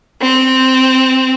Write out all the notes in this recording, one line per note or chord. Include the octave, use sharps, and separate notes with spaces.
C4